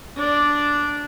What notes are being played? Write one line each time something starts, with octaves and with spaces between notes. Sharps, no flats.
D4 D5